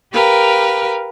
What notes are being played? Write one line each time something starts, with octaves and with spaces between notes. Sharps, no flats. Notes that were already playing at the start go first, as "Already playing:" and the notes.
G4 A#4 B4 F5